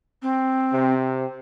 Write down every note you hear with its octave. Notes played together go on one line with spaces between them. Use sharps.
C4
C3